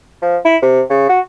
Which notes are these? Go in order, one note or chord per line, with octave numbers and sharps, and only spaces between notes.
F3
E4
C3
C#3
F#4